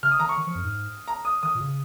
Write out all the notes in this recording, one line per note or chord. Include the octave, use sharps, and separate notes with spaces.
C#3 F6
D#6
D#3 A#5
C#6
D#3
F3
F2
G#2
A#5
D#6
D#3 D#6
A#2
C#3